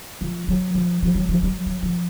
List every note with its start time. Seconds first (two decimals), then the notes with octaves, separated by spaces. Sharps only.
0.21 F3
0.48 F#3
0.74 F3
1.02 F3
1.15 F#3
1.29 F3
1.43 F#3
1.66 F#3
1.83 F3